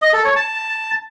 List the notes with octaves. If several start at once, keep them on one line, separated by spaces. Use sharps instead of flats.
D#5
A4
C#5
A5